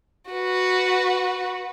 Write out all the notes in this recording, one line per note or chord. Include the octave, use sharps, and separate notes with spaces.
F#4 B4